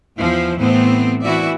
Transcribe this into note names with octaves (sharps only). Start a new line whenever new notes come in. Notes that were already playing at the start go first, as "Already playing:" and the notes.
E2 F3 E4 C5
A2 E3 A3 B3 C4 C5
E3 E4 F#4 D5 E5